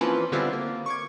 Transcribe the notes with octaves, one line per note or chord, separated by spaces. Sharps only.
E3 F3 A#3 C4 C#4 B4
D3 G3 B3 C4 E4 F4
A#3
C#6 D6 G#6